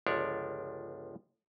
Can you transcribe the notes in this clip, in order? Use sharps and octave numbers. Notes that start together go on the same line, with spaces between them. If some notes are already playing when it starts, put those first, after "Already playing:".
G1 C#2 F3 D4 C#5 D5